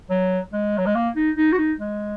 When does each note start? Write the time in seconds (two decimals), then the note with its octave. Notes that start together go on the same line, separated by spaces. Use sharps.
0.10 F#3
0.52 G#3
0.78 F#3
0.86 G#3
0.95 A#3
1.16 D#4
1.36 D#4
1.52 F#4
1.58 D#4
1.78 G#3